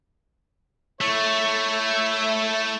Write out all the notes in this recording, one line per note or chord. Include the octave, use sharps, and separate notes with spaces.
A3 E4 C#5 E5